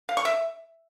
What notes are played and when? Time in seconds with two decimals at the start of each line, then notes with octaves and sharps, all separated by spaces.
0.09 F5
0.17 C#6
0.25 E5